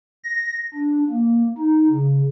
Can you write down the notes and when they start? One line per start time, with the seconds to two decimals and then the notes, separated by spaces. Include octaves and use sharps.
0.24 A#6
0.74 D4
1.10 A#3
1.57 D#4
1.88 C#3